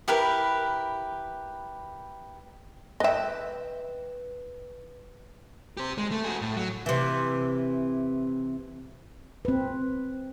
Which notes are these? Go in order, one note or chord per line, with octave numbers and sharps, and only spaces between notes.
E4 G4 A#4 B4
B4 D#5 E5 G5
G4 C5
G#3
A3
F#4 G#4
A2
F#3
C3 E3
C4 B4